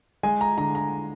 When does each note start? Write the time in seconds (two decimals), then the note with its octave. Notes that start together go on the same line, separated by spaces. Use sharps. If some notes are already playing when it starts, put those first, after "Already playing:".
0.23 G#3 G#5
0.41 A#5
0.58 D3 A#5
0.75 A#5